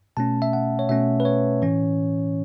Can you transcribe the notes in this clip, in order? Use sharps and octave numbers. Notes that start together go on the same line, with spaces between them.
B2 A3 C#4 A5
E5
F#5
C#5
B2 A3 C#4 E5
B4
C#5
A2 E3 C#4